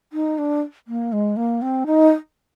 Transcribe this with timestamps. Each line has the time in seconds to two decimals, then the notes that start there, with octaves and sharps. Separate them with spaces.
0.13 D#4
0.38 D4
0.88 A#3
1.12 G#3
1.37 A#3
1.62 C4
1.86 D#4